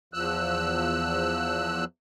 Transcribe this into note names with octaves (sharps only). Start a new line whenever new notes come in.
E2 F3 E6 F#6